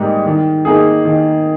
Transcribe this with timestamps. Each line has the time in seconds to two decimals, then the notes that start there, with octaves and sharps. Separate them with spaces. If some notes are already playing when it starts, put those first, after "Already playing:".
Already playing: G#2 G3 A#3 D#4
0.26 D#3
0.65 A#3 D#4 G#4
1.05 D#3